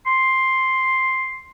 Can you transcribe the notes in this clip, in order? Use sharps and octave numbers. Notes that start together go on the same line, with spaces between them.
C6